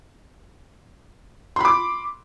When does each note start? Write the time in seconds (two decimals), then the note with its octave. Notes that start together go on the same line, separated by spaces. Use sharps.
1.56 C6
1.61 B5
1.65 D6